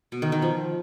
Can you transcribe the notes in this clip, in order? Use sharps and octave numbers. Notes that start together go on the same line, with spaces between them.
B2
D#3
D#3
F3